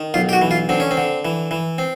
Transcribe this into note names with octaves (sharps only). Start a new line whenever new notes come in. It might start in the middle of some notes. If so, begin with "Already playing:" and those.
Already playing: D#3
B1 F4
G4
F#4
E3
F4
D3 C4
C#4
C4
D3
E3
E3
C4